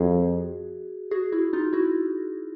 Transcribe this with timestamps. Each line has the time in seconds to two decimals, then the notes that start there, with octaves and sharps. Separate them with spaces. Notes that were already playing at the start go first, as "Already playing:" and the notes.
Already playing: F2 F#4 G#4
1.11 F#4 G#4
1.32 E4 F#4
1.53 D#4 F4
1.73 E4 F#4